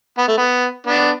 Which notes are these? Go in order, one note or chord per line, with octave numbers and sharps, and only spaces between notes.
B3
A3
B3
B3 D4